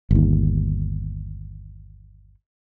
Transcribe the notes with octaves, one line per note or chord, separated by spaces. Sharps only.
G1 D#2